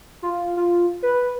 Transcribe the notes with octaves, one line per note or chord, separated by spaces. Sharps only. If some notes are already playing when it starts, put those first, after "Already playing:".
F4
F4
B4